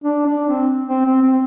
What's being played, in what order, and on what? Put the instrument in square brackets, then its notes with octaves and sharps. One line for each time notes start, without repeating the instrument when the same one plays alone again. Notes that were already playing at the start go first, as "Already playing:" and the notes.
[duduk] D4
D4
C4
C4
C4
C4